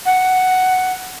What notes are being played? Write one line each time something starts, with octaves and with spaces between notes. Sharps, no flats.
F#5